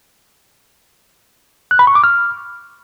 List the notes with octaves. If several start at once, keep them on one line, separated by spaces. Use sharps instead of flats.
F#6
B5
C#6
D6
F6